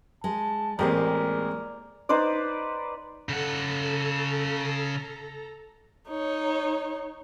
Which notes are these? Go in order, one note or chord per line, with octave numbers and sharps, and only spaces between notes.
G#3 A5
A1 G#3 A#3 C4 G4 G#4 A#4 D5
D#4 B4 C5 D5
C#3 A4 F#5 A#5
D#4 C#5